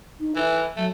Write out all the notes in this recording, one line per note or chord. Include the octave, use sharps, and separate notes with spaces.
D#4
E3 E5
F#3 A3